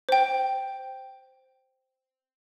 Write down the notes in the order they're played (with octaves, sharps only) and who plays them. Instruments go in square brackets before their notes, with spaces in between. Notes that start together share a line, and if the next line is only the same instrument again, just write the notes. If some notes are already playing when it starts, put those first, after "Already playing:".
[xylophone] C5 G5